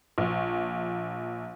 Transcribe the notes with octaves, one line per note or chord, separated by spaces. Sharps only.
A#1